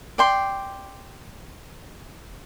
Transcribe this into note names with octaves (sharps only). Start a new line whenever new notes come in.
D5 G5 C6